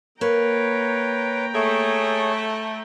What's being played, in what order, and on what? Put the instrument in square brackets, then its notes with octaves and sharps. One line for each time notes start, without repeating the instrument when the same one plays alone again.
[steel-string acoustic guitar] A#3 [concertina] B4 C#5 [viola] G5 A#5
[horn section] A3 [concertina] G#4 C#5